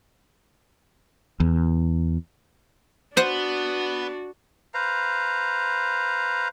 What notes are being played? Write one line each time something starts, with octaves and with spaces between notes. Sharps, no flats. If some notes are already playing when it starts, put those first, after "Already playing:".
E2
B3 D4 F#4 C5 F#5
B4 C5 F5 A#5